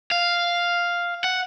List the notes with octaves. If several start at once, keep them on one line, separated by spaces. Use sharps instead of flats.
F5
F#5